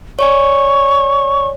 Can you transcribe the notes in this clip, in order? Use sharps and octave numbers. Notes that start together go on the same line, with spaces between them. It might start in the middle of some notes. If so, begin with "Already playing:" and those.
C#5 D5 G#5 C#6